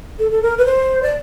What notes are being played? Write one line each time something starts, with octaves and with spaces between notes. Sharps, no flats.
A4
A4
A#4
B4
C5
D5